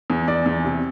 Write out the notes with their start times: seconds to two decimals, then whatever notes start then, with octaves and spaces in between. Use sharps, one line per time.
0.10 E2
0.28 E2 D5
0.46 E2
0.64 C3